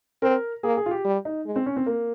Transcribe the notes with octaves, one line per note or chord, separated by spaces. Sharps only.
C4 A#4
A#3 G#4
G#4
F4
G4
G3
D#4
G#3
C4
C#4
C4
A#3